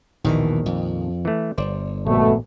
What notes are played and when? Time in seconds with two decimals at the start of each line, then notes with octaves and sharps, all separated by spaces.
0.24 A#1 D#2 B2 D#3 E3
0.66 F2
1.25 E3 A3
1.58 G1 C5 D5
2.07 A#1 B2 A3